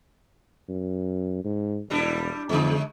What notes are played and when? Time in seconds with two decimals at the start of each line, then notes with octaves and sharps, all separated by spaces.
0.69 F#2
1.44 G#2
1.90 E1 G3 D4 E4
2.49 F2 C#3 G#3